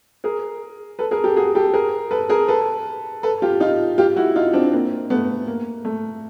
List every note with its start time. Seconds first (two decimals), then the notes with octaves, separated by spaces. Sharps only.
0.24 G#4 A#4
0.99 A4 B4
1.11 G#4 A#4
1.24 G4 A4
1.36 F#4 G#4
1.55 G4 A4
1.74 G#4 A#4
2.11 A4 B4
2.29 G#4 A#4
2.48 A4 B4
3.23 A4 B4
3.42 F4 G4
3.60 D#4 F4
3.98 F4 G4
4.16 E4 F#4
4.36 D#4 F4
4.53 C4 D4
4.73 A#3 C4
5.10 A3 B3
5.47 A#3
5.85 A3